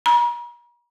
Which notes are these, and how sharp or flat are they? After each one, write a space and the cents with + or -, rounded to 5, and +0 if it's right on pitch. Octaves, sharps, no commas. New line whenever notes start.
A#5 +45